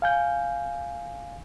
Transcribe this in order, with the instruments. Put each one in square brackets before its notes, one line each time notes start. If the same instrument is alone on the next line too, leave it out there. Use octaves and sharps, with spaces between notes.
[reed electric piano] F5 G#5 G6